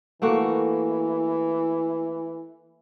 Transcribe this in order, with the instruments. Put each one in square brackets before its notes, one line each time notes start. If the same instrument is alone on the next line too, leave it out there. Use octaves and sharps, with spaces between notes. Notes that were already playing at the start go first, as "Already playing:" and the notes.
[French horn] E3 [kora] A3 A#3 F#4